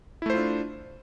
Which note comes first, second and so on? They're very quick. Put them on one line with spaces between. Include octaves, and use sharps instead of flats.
E4 A3 C5 F4 D4